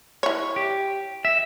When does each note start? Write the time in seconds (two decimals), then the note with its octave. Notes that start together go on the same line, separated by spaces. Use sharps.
0.23 E4 C#5
0.56 G4
1.25 E5